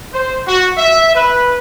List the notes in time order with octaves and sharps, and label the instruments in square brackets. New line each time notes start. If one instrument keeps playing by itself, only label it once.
[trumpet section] C5
F#4
E5
B4